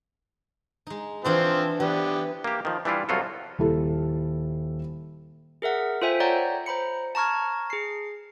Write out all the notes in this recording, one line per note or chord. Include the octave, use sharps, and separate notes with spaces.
G#3 D#4
E3 F3 C4 D4 F#4 C5
E3 B3 D4 G4
A#3 G4
D#3 F3
E3 G3 D4 E4 F4
C2 F3 F#3 F4 F#4 A4
D#1 E4 A4
G#4 A#4 E5 F#5
F4 A4 C5 E5 G5 G#5
C#5 D5 F#5 G5 A#5 G6
C5 A#5 B5 C#7
A5 A#5 C#6 F6 G#6
G#4 C7